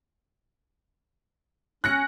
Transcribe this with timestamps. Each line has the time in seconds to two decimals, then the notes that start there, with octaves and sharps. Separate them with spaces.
1.84 C#4 F#6 A#6 C#7